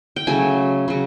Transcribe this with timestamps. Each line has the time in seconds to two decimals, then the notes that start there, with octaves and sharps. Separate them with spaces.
0.16 G5
0.27 C#3 F#3 A3 G#5
0.88 C#3 F#3